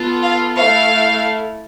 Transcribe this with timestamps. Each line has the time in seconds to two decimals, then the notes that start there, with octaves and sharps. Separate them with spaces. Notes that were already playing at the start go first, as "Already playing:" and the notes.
Already playing: B3 F4 A4
0.23 F5
0.59 A3 E4 A4 F5